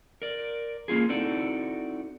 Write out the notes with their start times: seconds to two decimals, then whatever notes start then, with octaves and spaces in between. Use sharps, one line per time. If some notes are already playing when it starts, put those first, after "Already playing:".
0.22 A#4 D5
0.88 A#3 C#4 F4 G#4
1.09 C4 D#4 E4 F#4 A4 D5